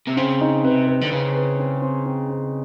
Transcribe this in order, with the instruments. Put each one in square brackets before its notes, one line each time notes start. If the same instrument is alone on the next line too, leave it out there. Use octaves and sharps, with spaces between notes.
[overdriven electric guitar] C3
[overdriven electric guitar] C#3 [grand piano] C4
[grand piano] D#4
[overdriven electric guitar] C3 [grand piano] B4
[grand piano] B4
[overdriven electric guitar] D3
[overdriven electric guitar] C#3 [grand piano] B4
[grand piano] B4
C4
C4
C4
C4